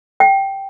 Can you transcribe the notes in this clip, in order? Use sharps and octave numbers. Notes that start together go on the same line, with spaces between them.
G5